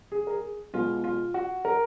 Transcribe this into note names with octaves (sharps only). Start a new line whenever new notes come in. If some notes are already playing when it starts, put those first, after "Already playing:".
G#4
A#4
G#4
B2 G#3 B3 F4
F4
F#4
A#4